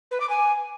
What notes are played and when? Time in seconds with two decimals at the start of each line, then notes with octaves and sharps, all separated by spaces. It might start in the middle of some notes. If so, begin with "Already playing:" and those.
0.11 B4
0.20 D6
0.30 G#5